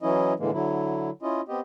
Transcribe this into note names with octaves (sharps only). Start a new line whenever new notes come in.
E3 F#3 C#4 E4 D#5
A2 D3 E3 G#3 A#3
D3 F#3 E4
C#4 E4 F4 D#5
B3 C4 G4 D#5